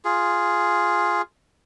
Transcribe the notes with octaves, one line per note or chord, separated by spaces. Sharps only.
F4 G#4